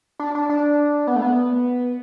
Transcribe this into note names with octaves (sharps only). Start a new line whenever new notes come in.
D4
D4
D4
B3
A3
B3